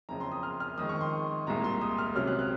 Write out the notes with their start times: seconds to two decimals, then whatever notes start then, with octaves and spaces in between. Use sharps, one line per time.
0.09 F#1 F2 C#3 A#5
0.20 C6
0.32 D#6
0.43 F6
0.60 F6
0.78 F2 D#3 G#3 D#6
0.89 C#6
1.01 C6
1.47 C2 A#2 G#3 A#5
1.64 C6
1.81 D#6
1.98 F6
2.16 C#2 C3 F#3 C#4 F6
2.27 F#6
2.39 F#6